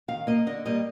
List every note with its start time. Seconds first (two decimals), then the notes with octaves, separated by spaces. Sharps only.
0.08 D#3 F5
0.27 A#3 D#5
0.47 D3 D#5
0.65 G3 A#3 D#5